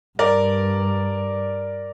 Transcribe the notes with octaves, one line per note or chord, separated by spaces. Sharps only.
G2 A#4 D5